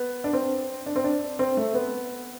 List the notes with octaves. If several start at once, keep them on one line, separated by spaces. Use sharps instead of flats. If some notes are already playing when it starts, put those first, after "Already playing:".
Already playing: B3
D4
C4
D4
C4
D4
C4
A3
B3